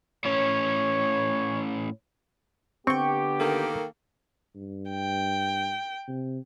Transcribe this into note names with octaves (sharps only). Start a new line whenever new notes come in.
A2 C#4 C#5
D3 B3 C4 G4 G5 C#6
D#3 A#3 A4
G2
G5
C3